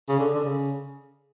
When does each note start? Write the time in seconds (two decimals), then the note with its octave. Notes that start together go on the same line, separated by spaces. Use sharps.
0.09 C#3
0.19 D3
0.35 D3
0.44 C#3